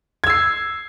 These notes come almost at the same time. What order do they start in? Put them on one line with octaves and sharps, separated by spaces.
G#6 E6 C7